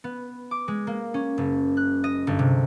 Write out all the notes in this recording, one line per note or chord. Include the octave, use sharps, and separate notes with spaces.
B3
D6
G#3
A#3
C#4
F#1
F#6
D#5
G1
C3